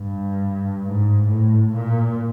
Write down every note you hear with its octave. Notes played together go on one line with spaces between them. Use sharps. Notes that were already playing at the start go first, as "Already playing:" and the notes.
Already playing: G2
G#2
A2
A#2